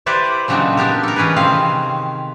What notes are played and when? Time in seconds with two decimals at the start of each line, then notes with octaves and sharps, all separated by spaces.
0.06 E4 G4 B4 C5 D5 E5
0.48 A#2 C#3 F#3 C4 D4 D#4
0.77 B3 D4 G4 A#4
1.03 A4 A#4
1.16 E3 C#4 D#4 G#4 B4
1.36 C3 D#3 C4 F5